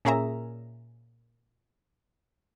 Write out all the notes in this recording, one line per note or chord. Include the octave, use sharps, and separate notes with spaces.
A#2 C#4 G#4 A#4 E5 A#5